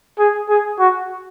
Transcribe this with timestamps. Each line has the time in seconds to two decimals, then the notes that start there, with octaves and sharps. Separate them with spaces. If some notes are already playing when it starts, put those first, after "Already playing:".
0.19 G#4
0.49 G#4
0.79 F#4